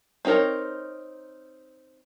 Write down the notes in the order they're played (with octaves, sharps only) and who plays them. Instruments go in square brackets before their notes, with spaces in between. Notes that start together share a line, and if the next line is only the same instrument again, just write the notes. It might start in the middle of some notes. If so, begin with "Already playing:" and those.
[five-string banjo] C4 D#4 F#4 A#4 C#5